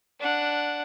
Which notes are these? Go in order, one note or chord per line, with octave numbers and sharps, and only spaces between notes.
D4 F#5